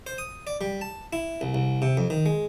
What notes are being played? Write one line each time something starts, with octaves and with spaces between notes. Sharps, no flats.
C5
D#6
D5
G3
A5
E4
C2
C2
C3
F2
D#3
G#3